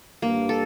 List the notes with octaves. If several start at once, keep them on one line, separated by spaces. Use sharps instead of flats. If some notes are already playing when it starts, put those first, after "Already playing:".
G2 A#3
A4